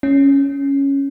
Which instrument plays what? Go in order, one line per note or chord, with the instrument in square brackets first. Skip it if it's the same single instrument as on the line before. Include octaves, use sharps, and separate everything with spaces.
[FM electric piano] C#4